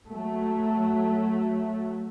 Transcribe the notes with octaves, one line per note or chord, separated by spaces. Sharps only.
F#3 A3